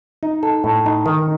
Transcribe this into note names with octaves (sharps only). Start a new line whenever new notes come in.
D#4
A4
A2
D#4
D#3